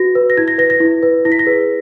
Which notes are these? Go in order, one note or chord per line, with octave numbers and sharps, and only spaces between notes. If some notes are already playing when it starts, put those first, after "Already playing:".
Already playing: F#4 B4 A#6
B4
A#6
E4 G#6
A#6
B4 A#6
A#6
E4
B4
E4 A#6
B6
A#6
G#4 B4